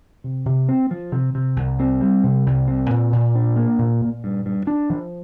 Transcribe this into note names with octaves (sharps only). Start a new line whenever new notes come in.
C3
C3
C4
F3
C3
C3
C2
C4
G3
C3
C2
C4
A#2
A#2
D4
A#3
A#2
A#2
G2
G2
D4
F3